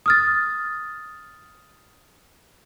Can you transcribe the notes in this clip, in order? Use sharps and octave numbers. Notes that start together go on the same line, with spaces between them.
D#6 F6 A6